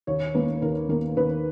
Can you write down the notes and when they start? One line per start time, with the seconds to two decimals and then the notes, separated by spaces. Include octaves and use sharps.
0.07 D#2 C#5
0.34 D#3 A#3 B4
0.62 D#2 A#4
0.89 D#3 A#3 A#4
1.17 D#2 B4